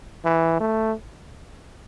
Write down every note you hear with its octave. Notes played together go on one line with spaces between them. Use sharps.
E3
A3